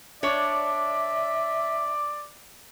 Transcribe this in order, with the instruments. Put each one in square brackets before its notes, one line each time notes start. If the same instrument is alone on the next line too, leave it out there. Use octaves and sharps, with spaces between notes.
[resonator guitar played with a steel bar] D4 C#5 [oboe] D5 [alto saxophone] E5